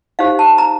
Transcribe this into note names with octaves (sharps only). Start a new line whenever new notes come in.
D#4 G4 C5 F5
A5
A#5